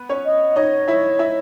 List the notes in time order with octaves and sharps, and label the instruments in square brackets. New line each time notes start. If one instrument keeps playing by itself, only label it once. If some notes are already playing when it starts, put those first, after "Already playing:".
Already playing: [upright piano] B3 B4
C#4 C#5
[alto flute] D#5
[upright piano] D#4 D#5 [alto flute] C#5
[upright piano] E4 E5
E4 E5